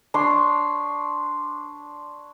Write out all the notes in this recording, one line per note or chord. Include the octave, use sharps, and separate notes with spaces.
D4 C#5 C6